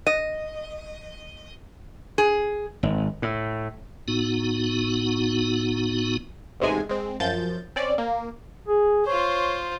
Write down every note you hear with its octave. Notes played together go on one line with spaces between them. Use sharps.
D#5
G#4
G#1
A2
A2 B3 D#4 F#4
A1 G#2 C3 G#3 G#5
G#3 C4
F#2 F3 G6 A6
C4 C#4 D5
A#3
G#4
F4 C5 C#5